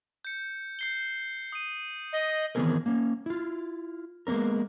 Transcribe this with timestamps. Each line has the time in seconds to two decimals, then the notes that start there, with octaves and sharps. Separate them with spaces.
0.25 G6 C#7
0.79 G6 C7 G7
1.52 D#6 D#7
2.13 D#5
2.55 D#3 E3 B3 C4 G#4 A#4
2.86 A#3 C#4
3.26 E4 F4
4.27 G#3 A#3 B3 C#4 A#4